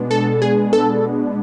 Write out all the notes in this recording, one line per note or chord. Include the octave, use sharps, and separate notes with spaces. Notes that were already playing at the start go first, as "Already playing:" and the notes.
Already playing: B2 G#3 B3 D4
A4
G#4
A4